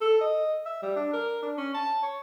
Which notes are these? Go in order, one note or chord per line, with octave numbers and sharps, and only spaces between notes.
A4
D#5
E5
G3
D4
A#4
D4
C#4
A5
C#5